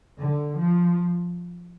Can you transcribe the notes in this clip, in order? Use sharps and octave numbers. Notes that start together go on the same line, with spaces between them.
D3
F3